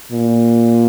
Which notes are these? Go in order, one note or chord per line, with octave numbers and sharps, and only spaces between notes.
A#2